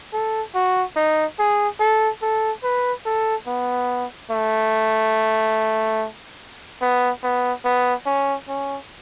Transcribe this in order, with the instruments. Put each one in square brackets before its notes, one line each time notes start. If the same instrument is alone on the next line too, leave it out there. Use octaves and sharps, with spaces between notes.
[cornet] A4
F#4
D#4
G#4
A4
A4
B4
A4
B3
A3
B3
B3
B3
C#4
C#4